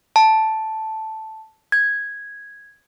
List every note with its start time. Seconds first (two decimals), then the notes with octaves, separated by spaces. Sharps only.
0.16 A5
1.72 G#6